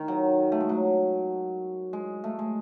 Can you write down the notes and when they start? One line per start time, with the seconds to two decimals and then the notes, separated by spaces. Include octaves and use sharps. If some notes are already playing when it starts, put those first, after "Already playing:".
Already playing: D#3
0.08 F#3
0.52 A3
0.60 G#3
0.69 F#3
1.93 G#3
2.24 A3
2.39 G#3